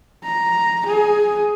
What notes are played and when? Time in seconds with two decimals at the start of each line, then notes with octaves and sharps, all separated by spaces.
0.24 A#5
0.86 G#4